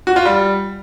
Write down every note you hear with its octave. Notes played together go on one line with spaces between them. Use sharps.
F#4
F4
G3